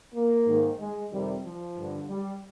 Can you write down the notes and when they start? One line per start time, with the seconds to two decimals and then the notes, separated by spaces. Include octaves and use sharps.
0.14 A#3
0.46 G#2 D#3
0.79 G#3
1.11 F2 C3 D#3 G3
1.44 F3
1.77 G2 D3
2.09 G3